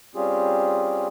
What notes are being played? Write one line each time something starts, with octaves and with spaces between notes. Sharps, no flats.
G3 C4 C#4 F4 G4 G#4